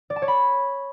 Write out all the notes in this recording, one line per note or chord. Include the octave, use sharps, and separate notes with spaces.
D5
A5
C#5
B5